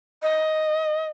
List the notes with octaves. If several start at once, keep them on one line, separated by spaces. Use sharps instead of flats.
D#5